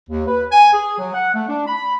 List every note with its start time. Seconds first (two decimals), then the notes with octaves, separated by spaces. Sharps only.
0.10 D#2
0.27 B4
0.52 G#5
0.74 G#4
0.99 F#3
1.14 F#5
1.35 A3
1.49 D4
1.67 B5